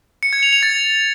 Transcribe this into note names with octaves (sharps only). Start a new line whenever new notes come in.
C#7
G#6
F7
F7
A6